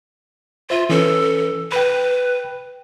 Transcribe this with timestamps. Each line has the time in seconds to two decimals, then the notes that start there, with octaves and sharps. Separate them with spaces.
0.70 F4 C5 E5
0.89 E3 C#4 A4 B4
1.72 B4 G5 B5